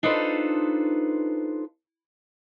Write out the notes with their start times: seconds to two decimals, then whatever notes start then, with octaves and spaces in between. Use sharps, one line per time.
0.03 D4 D#4 F4 A4 B4 C5